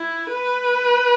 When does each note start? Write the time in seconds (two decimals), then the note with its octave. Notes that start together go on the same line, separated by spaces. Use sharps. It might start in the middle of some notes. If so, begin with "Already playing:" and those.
Already playing: E4
0.31 B4